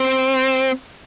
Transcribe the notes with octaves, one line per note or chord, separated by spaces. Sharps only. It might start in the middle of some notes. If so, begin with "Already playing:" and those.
Already playing: C4